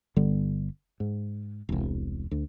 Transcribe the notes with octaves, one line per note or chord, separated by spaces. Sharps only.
G1 D3 G3 B3
G#2
E1 C2
D2